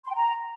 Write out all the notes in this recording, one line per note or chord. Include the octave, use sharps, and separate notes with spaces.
C6
G5
A#5